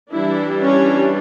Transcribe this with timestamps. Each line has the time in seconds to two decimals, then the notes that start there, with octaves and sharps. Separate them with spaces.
0.12 E3 G3 D4 E4
0.62 C#4 C#5